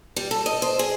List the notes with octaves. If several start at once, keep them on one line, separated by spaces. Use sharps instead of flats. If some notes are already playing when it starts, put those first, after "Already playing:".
G3
A4
D#5
C5
G#4